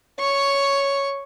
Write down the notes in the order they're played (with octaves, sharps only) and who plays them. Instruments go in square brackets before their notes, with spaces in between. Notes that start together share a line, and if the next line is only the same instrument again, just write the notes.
[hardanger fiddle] C#5 C#6